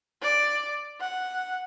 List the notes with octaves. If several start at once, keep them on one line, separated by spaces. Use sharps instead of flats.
D5
F#5